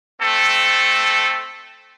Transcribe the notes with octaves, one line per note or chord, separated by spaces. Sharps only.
A3 C4 A4